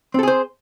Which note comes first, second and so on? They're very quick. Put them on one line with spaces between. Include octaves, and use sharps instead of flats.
C4 A4 G#4 C5